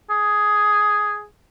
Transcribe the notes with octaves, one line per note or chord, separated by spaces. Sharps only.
G#4